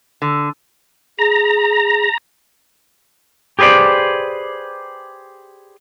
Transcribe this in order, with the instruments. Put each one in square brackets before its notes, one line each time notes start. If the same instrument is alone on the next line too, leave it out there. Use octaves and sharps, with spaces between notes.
[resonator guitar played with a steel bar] D3
[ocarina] G#4 [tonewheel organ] A#5
[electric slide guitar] G4 G#4 B4 C5 D5